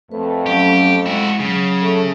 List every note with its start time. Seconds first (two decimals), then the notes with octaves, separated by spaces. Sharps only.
0.12 F2 A3 B4
0.46 F#3 C#4 G4 F5
1.06 G#3 E4 F#4
1.40 C#3 F#3
1.82 A3